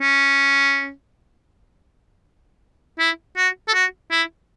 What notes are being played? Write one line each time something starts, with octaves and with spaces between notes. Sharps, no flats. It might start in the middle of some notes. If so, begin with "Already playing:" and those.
C#4
E4
F#4
A4
F#4
E4